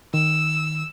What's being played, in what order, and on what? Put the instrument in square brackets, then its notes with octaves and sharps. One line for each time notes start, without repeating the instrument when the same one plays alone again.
[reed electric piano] D#3 [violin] E6